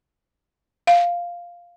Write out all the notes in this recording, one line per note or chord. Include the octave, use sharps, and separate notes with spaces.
F5